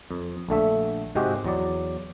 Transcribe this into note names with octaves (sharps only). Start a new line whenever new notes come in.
F2
A#1 D3 A3 E5
G#2 C3 G#3 C4 F#4 G4
E2 F#3 D5